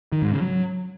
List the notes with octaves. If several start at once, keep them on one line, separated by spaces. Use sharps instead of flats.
D#3
G#2
C#3
F#3